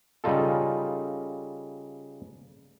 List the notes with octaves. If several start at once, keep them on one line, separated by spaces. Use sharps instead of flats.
C#3 G3 D#4 F4 A4